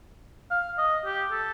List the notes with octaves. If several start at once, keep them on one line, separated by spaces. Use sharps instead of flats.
F5
D#5
G4
A4